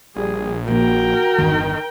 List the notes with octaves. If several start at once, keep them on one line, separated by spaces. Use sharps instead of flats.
A#1 G3 G#4
A#2 F3 F#4 A#4 G5
G1 E2 D#3